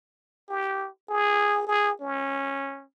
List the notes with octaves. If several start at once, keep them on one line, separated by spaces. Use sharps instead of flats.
G4
G#4
G#4
C#4